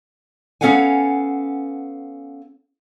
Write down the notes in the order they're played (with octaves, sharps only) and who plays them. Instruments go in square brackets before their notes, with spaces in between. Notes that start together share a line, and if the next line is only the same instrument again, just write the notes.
[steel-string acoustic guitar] B3 C#4 A4 F5 F#5 G#5